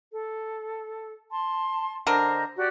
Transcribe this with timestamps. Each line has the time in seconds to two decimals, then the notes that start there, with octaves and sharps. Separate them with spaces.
0.11 A4
1.31 A5 C6
2.07 D3 A#4 C5 D#5 A#5
2.56 F#4 G4 D5